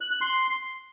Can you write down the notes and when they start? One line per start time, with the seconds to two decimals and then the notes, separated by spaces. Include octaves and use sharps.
0.01 F#6
0.11 F#6
0.21 C6